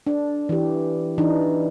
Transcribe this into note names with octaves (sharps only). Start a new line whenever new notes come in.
D4
E3 G4
E3 D4 D#4